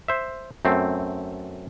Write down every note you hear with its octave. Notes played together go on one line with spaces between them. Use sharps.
C5 E5
F#2 A3 C4